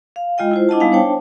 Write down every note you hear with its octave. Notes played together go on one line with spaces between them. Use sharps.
F5
G#3 F4 D#5 G5
E4 F4 C5
D4 E4 D#5 F#5 A5
G3 B3 D#4 F5 G#5
D4 C5 C#5 G5 A5